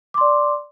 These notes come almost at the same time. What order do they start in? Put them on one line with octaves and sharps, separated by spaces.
D6 C6 D5